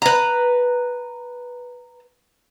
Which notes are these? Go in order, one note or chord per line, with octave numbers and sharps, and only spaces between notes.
B4 A#5